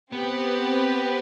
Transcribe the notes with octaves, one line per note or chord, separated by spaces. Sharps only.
B3 C4 G4 B4